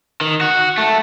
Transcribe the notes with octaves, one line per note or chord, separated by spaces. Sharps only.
D#3
F#4
A3